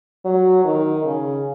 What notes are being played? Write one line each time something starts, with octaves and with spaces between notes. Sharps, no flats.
F#3
D#3
C#3